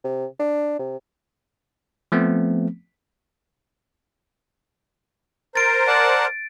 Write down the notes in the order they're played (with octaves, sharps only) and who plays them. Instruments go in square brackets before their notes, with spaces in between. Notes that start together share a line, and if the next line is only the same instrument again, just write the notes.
[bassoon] C3
D4
C3
[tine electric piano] F3 A3 B3 C4
[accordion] A#4 C5 [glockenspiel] A6 D7
[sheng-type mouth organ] D5 F#5 A5